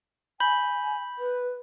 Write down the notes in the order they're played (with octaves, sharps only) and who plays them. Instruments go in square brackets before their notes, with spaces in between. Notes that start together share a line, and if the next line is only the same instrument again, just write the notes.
[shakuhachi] G#5 [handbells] B5 G6
[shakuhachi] B4